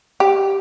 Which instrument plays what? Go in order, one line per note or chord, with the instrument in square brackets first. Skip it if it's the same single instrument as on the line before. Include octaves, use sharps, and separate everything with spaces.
[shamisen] G4